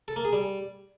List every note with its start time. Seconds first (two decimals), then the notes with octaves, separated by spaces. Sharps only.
0.08 A4
0.16 A#3
0.24 G#4
0.33 G3